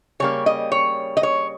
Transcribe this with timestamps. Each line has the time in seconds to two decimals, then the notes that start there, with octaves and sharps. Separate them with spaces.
0.20 C#3 G3 A#3 C#5
0.46 D#5
0.72 C#5
1.17 D#5
1.23 C#5